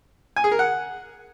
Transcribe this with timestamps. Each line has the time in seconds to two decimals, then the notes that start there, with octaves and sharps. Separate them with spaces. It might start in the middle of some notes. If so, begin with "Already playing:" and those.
0.36 G#5
0.44 G#4
0.52 A#4
0.59 F#5